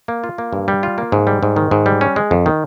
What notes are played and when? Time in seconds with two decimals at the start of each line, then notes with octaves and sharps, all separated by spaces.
0.08 A#3
0.24 F4
0.38 A#3
0.53 G2
0.68 G3
0.83 F4
0.98 A#3
1.12 G#2
1.27 G3
1.43 G#2
1.56 D#3
1.71 G#2
1.86 G3
2.01 C#4
2.16 G#3
2.31 F2
2.46 D#3